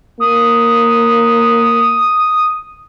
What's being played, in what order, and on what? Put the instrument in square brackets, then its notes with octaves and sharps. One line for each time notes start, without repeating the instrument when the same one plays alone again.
[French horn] A#3 [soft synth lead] D#6